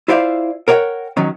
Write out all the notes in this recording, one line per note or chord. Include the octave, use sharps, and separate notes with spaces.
E4 F4 C5 D5 E5 F5
A#4 C#5 D5 F#5 G5
D#3 F#3 C#4